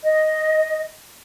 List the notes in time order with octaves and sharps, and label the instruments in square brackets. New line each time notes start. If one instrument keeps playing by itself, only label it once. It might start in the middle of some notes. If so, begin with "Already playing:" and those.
[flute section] D#5